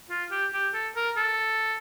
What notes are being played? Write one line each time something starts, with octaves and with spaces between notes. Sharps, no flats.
F4
G4
G4
A4
A#4
A4